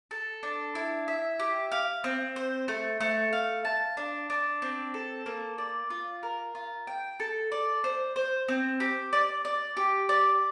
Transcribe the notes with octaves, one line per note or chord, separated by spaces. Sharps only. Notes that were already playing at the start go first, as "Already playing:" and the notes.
A4
D4
E4
E5
G4
F5
C4
C5
A3
A3
F5
A5
D4
D4
C4
A4
A#3
D5
F4
A#4
F4
G5
A4
D5
C5
C5
C4
G4
D5
D5
G4
D5